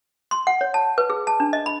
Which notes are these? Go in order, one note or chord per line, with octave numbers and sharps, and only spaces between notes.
C6
F#5
C#5
A5
B4
G#4
A5
D4
D#5
B5